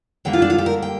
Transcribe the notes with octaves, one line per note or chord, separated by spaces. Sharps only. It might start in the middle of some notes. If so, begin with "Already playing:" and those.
D3 G3 A#3 G5
F4
D4
F4
G4
A#4
G5